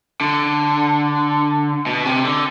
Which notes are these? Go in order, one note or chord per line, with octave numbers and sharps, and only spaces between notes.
D3
B2
C3
D3